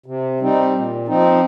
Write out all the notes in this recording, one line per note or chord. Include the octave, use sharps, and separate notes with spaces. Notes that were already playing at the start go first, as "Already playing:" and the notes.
C3
G3 C4 D#4
A#2
F3 C4 D#4